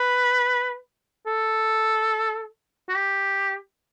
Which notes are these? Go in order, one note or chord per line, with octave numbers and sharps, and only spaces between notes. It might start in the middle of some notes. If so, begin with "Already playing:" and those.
Already playing: B4
A4
F#4
G4